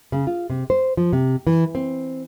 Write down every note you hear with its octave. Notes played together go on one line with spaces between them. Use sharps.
C#3
F4
C3
C5
F3
C3
E3
C4